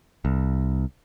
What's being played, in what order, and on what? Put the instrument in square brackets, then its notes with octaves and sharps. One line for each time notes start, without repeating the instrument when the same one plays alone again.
[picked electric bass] C2